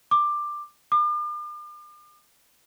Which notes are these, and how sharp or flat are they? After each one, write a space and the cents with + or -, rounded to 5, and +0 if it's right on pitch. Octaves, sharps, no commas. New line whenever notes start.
D6 +15
D6 +40